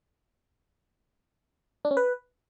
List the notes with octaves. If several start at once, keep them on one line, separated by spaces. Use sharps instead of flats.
D4
C#4
B4